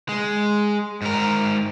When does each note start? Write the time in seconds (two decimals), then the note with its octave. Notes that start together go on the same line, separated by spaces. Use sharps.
0.09 G#3
1.02 G#2 A#4